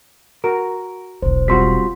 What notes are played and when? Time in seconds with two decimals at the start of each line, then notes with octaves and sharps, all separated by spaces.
0.44 F#4 A#4
1.22 E1 B1 C5
1.48 G3 C4 F4 F#4 C6 B6